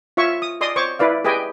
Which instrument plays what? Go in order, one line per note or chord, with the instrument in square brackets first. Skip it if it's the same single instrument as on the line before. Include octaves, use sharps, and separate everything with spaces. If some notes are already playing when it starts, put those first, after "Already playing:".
[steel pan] F4 C#5 E5 C#6
D#6
D5 D#5 C6 D#6
C5 C#5 C#6 D6
E4 B4 D5 F5
G4 G#4 B4 D#5 G5 G#5